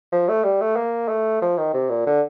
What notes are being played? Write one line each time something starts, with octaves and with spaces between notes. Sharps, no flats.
F3
A3
G3
A3
A#3
A3
F3
D#3
C3
A#2
D3